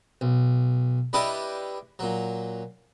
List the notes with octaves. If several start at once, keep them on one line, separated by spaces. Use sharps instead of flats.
B1
G3 D4 E4 G4 B4 D#5
A#2 F#3